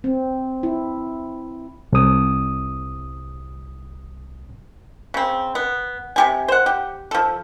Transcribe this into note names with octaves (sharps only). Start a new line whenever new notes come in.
C4
E4
C2 D#6
C#3 C4
B3
C3 G4 G#5
C5 F#5
G4
F3 A4